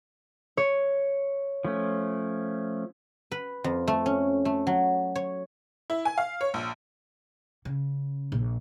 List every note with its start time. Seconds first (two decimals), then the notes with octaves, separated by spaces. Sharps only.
0.57 C#5
1.65 F3 A3 C#4
3.32 B4
3.64 F2
3.88 A3
4.06 C#4
4.45 A3
4.67 F#3
5.16 C#5
5.90 E4
6.05 G#5
6.18 F5
6.41 C#5
6.54 A#1
7.65 C#3
8.32 A#1